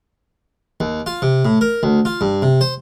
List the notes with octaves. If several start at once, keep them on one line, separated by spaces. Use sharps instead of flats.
D#2
F4
C3
A2
A#4
D2
F4
G2
C3
C5